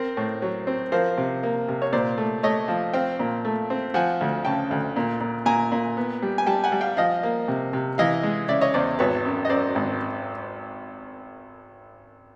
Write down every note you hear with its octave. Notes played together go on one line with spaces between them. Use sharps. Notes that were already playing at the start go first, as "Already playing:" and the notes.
Already playing: C4 A#4 C5
A2
F#3
C4
F3 A#4 C5
C3
A#3
C3
C#5
A#2 C5 D5
A3
A3 C#5 D#5
F3
C4 F5 G5
A#2
A3
C4
F3 F#5 G#5
D2
C#3 G5 A5
D2
A#2
A#2
A#2 G#5 A#5
A#2
B3
G3
G#5
G3 G5 A5
F#5 G#5
G3
F5 G5
F3 D#5 F5
A#3
C3
C3
E3 D#5 F5
G#3
C#3 D5 E5
C#5 D#5
E2 C5 D5
G#1 B4 C#5
F#2
D#5
F#2 C5 D5
G#1